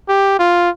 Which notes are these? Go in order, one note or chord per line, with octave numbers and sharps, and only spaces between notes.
G4
F4